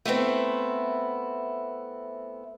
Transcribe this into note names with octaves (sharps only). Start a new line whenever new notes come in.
A3 B3 C4 E4